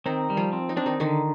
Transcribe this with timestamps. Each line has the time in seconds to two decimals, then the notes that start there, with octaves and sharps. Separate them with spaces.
0.06 D#3 C4 D#4
0.30 G3
0.37 F3 F4
0.53 C4
0.69 D#4
0.77 C4 D4
0.86 D#3 D#4
1.00 D3 D#3 D#4